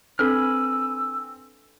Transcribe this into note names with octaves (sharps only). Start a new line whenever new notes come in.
C4 D4 A4 B4 G#5 B5 E6 F6